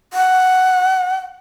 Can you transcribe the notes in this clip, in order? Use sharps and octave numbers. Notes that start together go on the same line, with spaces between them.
F#5